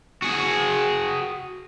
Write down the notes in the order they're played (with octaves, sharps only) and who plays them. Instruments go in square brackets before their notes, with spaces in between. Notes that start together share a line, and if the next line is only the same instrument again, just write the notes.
[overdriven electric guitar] F#4 G#4